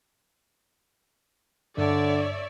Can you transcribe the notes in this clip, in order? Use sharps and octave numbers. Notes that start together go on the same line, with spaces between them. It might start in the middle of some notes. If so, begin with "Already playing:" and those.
G2 D3 C#5 D5 E5